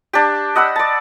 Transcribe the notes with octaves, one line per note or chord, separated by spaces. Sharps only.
D4 G4
D#5 F#5 B5 E6
D5 A5